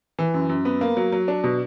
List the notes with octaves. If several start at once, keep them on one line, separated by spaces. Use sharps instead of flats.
E3
F#2
F#2
B3
A#3
F#3
F#3
D4
B2